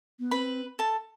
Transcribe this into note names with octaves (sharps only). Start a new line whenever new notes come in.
B3
C4 B4 B5
A4 A5